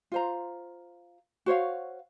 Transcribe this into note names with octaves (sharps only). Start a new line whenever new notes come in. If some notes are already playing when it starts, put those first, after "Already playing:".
F4 C5 A#5
F#4 C5 C#5 F5